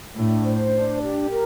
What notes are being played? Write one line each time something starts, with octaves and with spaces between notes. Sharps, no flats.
A2 D4
C5
D4
G4
A#4